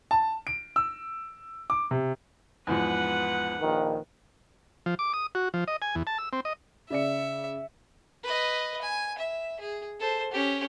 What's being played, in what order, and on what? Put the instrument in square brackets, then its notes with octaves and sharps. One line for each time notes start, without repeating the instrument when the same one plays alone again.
[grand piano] A5
D7
E6
D6
C3
[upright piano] E2 G#2 F3 [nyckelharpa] B4 F#5
[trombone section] A#1 D#3
[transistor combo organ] F3
D6
D#6
F#4
F3
D#5
G#5
E2
A5
E6
C4
D#5
[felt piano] C#3 D5 C#7 [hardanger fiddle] E5
[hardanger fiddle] B4 D#5
G#5
E5
G#4
A4 C5
C#4 G4